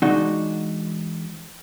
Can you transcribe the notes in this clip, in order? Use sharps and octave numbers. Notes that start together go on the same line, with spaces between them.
E3 G#3 D4 D#4 F#4 D#5